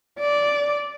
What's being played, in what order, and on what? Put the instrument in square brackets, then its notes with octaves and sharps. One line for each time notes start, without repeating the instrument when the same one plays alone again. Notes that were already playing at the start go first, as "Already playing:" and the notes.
[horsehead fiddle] D5